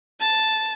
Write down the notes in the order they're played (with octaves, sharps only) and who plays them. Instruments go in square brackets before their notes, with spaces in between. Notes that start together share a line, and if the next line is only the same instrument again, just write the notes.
[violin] A5